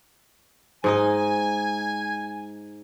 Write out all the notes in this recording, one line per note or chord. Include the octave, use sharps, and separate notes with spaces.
G#2 D#4 D#5 G#5